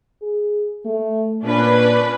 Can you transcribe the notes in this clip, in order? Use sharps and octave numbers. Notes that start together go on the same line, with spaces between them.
G#4
A3
A#2 C#4 D4 B4